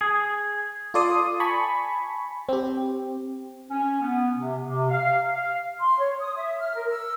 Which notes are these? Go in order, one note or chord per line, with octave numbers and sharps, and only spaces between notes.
G#4
F4 A4 D5 C6 D#6
G#5 A5 B5 C#6
C4 G4
C#4
B3
C3
C3
F5
F5
C6
C#5
D#6
E5
F6
A#4
E6